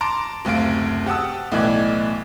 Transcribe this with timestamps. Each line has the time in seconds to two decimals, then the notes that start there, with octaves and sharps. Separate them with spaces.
0.01 A5 A#5 C6 D6 D7
0.45 F#1 D2 C3 F5 D7
1.06 G4 F#5 A5 D#6 E6
1.52 B1 A2 E3 D5 F#6 G#6